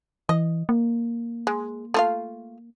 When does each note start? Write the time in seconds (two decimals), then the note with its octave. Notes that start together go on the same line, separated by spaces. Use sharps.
0.29 E3 D#5
0.69 A#3
1.47 G#3
1.94 A3 F4 F5